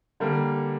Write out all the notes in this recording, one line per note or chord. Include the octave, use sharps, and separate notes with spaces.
D3 G3 A#3